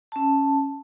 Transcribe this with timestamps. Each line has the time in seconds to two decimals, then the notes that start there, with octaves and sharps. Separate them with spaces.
0.12 C#4 A5